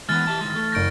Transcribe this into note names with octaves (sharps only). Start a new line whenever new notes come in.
E3 G#3 B3 F#5 F6 A6
G4 E5 A5
D#3 G#3
A3
F#1 C#6 G6 A#6 D7